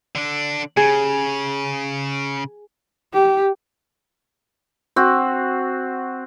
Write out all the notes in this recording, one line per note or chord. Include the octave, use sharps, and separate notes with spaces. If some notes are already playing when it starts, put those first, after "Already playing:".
D3 D4
C#3 G#4
G4
C4 F#4